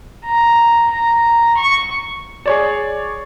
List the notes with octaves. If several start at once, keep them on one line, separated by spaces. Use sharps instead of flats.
A#5
A#5
C#6
G#4 C#5 D5